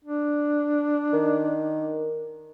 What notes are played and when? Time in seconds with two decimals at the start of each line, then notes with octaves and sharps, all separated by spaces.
0.04 D4
1.13 D#3